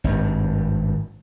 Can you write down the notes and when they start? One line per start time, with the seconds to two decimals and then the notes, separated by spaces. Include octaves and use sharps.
0.04 G#1 G2